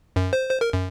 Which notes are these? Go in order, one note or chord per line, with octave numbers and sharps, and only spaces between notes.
F#2
C5
C5
A#4
F#2